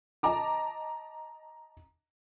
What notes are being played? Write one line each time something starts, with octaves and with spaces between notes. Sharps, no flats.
D#5 A5 A#5 D6